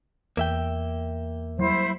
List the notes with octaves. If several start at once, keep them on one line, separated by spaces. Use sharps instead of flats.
E2 A#3 E5 G5
F#3 G3 E4 C5